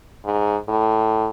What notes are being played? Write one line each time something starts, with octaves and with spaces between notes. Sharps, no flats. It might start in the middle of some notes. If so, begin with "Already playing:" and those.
G#2
A2